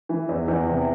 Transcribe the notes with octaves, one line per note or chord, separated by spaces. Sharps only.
E3
E2
E2
C3